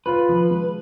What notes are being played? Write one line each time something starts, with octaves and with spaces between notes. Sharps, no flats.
F4 B4
F3
G#3